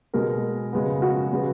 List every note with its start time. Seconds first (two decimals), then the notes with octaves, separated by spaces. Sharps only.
0.14 B2 G#3 B3 A#4
0.73 C#3 G#3 B3
1.02 F#4
1.32 C#3 G#3 B3